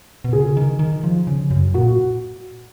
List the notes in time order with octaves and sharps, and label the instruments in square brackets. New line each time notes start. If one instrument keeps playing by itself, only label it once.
[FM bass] B2
[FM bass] C#3 [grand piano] G#4
[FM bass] D#3
D#3
F3
C#3
F#2
[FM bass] A#2 [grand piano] F#4